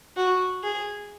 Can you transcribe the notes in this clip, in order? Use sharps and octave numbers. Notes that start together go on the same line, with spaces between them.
F#4
G#4